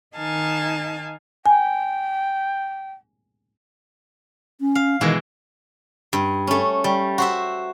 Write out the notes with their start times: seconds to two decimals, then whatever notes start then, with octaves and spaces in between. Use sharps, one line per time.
0.16 D#3 D#4 F5 G#5 A5
1.46 G5 G#5
4.60 C#4
4.75 F5
5.01 B2 D#3 E3 G#3
6.13 G2
6.47 A3 C#4
6.84 G3
7.18 F#4 C5 E5